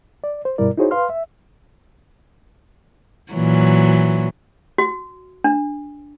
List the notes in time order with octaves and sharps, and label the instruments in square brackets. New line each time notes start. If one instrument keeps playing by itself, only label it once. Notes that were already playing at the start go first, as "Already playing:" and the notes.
[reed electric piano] D5
C5
G2 B2 G3 E4 A#4 D5
D#4 E4 F#4 G#4 C5 C#5
B4 F5 C6 F6
E5
[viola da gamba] A#2 E3 F#3
[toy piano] F#4
D4